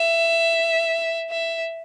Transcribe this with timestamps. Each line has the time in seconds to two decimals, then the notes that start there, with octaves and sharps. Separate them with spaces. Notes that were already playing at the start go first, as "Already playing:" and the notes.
Already playing: E5
1.30 E5